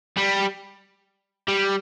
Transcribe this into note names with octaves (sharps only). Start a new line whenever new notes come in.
G3
G3